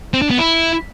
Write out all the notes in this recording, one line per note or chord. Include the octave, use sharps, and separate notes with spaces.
C4
D4
B3
E4